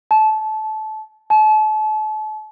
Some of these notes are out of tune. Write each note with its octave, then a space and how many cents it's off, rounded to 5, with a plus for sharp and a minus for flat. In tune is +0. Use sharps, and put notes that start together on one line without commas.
A5 -20
A5 -35